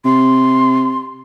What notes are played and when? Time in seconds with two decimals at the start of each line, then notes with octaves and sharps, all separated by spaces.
0.05 C3 C6